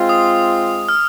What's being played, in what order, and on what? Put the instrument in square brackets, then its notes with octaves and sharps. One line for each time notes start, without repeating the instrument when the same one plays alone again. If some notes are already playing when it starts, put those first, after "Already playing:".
Already playing: [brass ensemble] G#3 C4 F4
[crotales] D#6
F6